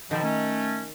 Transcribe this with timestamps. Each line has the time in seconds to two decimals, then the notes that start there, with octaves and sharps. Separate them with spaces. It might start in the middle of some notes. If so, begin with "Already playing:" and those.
0.11 B2 D3 D#3 F3
0.23 A3 C#4